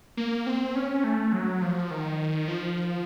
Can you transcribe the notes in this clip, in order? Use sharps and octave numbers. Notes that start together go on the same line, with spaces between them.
A#3
C4
C#4
A3
F#3
F3
D#3
F3